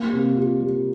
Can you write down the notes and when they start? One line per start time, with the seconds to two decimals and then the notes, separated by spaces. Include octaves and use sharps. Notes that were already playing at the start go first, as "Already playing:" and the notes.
Already playing: A#3
0.13 C3
0.37 F4
0.60 G3